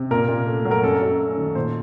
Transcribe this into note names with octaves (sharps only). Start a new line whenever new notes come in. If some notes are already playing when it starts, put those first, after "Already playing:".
Already playing: C3
A#2 A#4
A#2
A3
F#3
A#4
F#2 A4
F#2
A3
D#3
A#2 C5